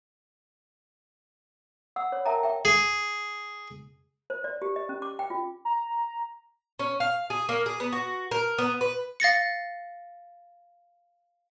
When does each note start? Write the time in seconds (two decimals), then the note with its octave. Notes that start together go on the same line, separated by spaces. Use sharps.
1.96 F#5 E6
2.12 C#5
2.25 A#4 E5 G5 A5 A#5
2.43 E5 G5
2.65 G#4
4.30 C5
4.44 D5
4.62 G4
4.76 D#5
4.89 C#4
5.02 D6
5.19 G5
5.30 F4
5.65 A#5
6.79 C#4
7.00 F5
7.30 G#4
7.49 A#3
7.66 G#4
7.80 B3
7.92 F#4
8.31 A#4
8.58 B3
8.81 B4
9.20 F5 A6 A#6 C#7